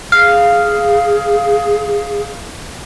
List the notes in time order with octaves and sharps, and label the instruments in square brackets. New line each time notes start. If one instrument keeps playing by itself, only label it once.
[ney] G#4 [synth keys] F5